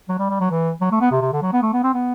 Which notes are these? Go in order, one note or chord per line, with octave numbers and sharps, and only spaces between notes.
F#3
G3
G3
F#3
E3
F#3
A3
B3
C3
C3
D3
F#3
B3
A3
B3
C4
B3